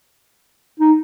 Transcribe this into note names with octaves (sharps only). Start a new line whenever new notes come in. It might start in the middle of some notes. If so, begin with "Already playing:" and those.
D#4